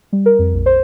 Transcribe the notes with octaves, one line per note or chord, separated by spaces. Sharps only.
G3
A#4
F2
A#1
C5